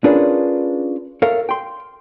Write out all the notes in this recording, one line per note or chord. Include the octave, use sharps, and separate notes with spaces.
C#4 D4 F4 G#4 A#4 B4
A4 A#4 C#5 E5 F5
G5 C6